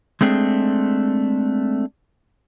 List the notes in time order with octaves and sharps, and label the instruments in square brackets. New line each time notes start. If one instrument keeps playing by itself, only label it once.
[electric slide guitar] G#3 A3 C4 D4 G#4